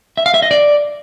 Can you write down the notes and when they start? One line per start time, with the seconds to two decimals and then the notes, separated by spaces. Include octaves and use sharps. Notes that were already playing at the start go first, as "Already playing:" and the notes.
0.17 E5
0.26 F5
0.34 E5
0.42 D#5
0.51 D5